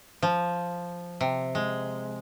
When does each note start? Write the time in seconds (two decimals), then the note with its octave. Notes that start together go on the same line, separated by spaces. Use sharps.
0.23 F3
1.21 C3
1.55 G#3